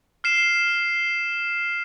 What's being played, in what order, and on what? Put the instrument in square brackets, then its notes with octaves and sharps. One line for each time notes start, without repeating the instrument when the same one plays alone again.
[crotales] F6 C7 E7